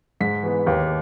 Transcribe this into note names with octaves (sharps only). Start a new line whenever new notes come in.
G#2 B6
E3 B3
D#2